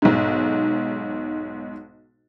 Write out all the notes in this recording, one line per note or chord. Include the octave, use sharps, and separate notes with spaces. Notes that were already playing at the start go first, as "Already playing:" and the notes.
B1 G#2